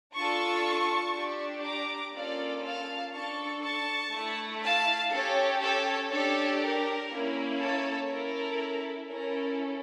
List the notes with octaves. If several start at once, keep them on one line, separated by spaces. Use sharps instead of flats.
D4 F4 A4 A5 C#6
D4 G4
A#5 D6
A#3 C#4 F4 A4 D5 F5
F5 A5
D4 A4 A5 C#6
A5 C#6
A3 E4 A4
F5 A5
C#4 G4 A4 C#5
A4 C#5
D4 G4 A4 C#5
A#4
A#3 C#4 E4
A4 C#5
C#4 E4 A4 A#4
C#4 E4 A4 A#4